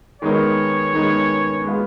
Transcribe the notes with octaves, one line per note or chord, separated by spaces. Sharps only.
D#3 G#3 B3 D#4 A#4 C#5
D#3 G#3 B3 D#4 A#4
G#3 B3 F4